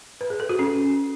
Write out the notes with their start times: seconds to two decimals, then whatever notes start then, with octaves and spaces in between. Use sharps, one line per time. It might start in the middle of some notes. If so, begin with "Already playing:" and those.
0.21 B4
0.30 G#4
0.40 A4
0.49 F#4
0.59 C#4